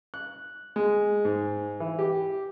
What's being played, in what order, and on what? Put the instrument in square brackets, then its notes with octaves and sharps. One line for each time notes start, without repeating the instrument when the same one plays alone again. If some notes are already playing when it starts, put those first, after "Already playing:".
[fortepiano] F#6
G#3
G#2
E3
G4